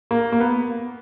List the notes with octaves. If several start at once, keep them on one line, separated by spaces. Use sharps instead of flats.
A#3
A#3
B3